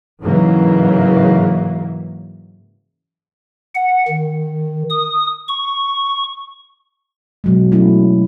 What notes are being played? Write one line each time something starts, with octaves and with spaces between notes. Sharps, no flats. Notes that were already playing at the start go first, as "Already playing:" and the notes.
G#2 C#3 E3 F#3 A#3
F#5
D#3
D#6
C#6
B2 F#3 G#3
F#3 A3 C#4 E4